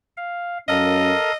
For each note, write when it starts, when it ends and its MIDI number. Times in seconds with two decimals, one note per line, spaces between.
0.17 0.58 77
0.68 1.13 42
0.68 1.13 61
0.68 1.32 69
0.68 1.32 70
0.68 1.37 75
0.68 1.32 77